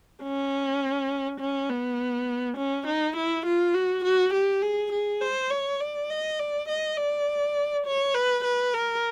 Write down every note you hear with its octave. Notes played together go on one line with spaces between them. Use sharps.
C#4
C#4
B3
C#4
D#4
E4
F4
F#4
F#4
G4
G#4
G#4
C5
C#5
D5
D#5
D5
D#5
D5
C#5
B4
B4
A#4